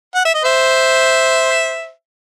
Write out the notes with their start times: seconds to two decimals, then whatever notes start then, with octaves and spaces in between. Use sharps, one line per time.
0.15 F#5
0.25 E5
0.34 D#5
0.44 C5 E5